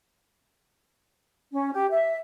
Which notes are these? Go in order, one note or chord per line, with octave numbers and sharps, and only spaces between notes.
C#4
G4
E5